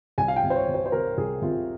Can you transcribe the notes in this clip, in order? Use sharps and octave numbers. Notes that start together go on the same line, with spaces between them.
C2 G#5
F5
G5
C3
C5
C#5
C3
C5
C5
C3 A#4
C2 G#4
C3 F4